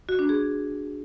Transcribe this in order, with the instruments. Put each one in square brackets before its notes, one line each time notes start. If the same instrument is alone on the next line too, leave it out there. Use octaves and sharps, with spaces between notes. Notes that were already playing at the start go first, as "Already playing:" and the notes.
[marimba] F#4
D4
G#4